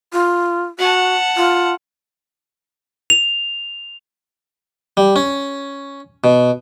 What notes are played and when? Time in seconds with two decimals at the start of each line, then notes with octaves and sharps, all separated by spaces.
0.13 F4
0.78 F#4 F#5 A5
1.37 F4
3.10 F7
4.97 G3
5.16 C#4
6.24 B2